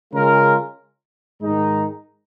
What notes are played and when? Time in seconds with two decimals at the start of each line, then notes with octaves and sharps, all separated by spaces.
0.12 C#3 G#3 C#4 F4 A#4
1.41 G#2 D#3 G#3 D#4